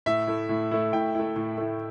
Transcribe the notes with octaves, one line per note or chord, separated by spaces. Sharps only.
A2 E5
A3 E4
A2
A3 E4
A2 G5
A3 E4
A2
A3 E4